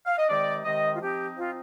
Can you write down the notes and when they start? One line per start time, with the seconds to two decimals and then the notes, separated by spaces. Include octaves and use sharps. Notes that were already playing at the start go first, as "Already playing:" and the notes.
0.07 F5
0.18 D#5
0.29 C3 D#3 G#3 D#4 D5
0.65 C3 D#3 G#3 D#4 D#5
0.94 F4
1.01 F3 C4 D#4 G4
1.37 F3 C4 D#4 F4